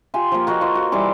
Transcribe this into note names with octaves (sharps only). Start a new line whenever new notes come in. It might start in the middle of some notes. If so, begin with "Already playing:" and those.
F4 G4 G#5 C6
F3 A#3
A#3 F#4 A4 D#5
F4 C5 D#5 C#6
F#4
E3 G3 C6 D6